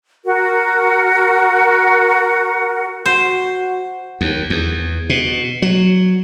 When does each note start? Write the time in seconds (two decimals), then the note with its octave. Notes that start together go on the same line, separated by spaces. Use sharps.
0.25 F#4 A#4
3.06 F#4 C5
4.21 D#2
4.50 E2
5.10 B2
5.62 F#3